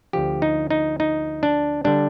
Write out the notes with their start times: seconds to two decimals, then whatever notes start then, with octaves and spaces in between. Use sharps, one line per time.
0.13 D2 D3 F3 G4
0.42 D#4
0.71 D#4
1.00 D#4
1.43 D4
1.84 D3 G3 D4